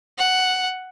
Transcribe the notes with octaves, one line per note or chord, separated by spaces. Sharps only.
F#5